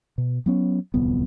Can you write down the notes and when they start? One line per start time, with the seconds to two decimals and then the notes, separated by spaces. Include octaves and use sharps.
0.18 B2
0.46 F#3 B3 C#4
0.94 D1 C2 F2 B3